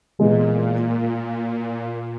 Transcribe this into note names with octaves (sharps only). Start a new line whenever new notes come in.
A#2 E3 G#3 B3